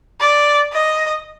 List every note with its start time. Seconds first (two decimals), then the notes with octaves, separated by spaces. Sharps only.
0.20 D5
0.73 D#5